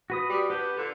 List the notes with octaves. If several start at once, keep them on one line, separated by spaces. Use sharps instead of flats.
F#4 B4 D#6
G3
D4 F#4 G4 B4
A#2 D3